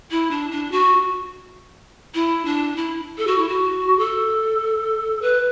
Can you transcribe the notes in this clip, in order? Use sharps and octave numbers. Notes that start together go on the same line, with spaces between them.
E4
D4
D4
F#4
E4
D4
E4
A4
F#4
E4
F#4
A4
B4